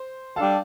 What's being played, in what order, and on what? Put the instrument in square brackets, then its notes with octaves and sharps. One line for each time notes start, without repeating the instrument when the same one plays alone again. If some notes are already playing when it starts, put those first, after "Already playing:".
Already playing: [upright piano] C5
[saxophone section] G3 D4 A4 [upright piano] F5 A5